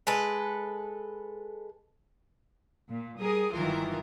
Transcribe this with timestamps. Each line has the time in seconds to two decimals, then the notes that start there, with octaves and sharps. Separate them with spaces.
0.07 G#3 A4 B4
2.89 A#2
3.20 G3 G#4 A#4 D#6
3.52 G1 D#3 E3 F#3 F4 A#4